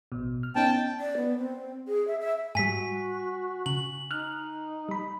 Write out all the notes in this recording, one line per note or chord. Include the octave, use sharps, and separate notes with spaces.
A1 B2
F6
B3 C#4 D#4 G5 A5
D5
B3
C4
G#4
E5
E5
G#2 G3 F#4 G#5 B6
C#3 F#7
D#4 F6 F#6
G3 B5